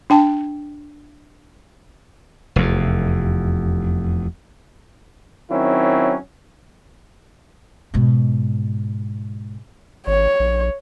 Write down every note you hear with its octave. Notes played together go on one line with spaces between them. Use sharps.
D4 G5 A5
F1 E2
D#3 F#3 C4 C#4 E4
G#2 B2
G#1 C#5
A#1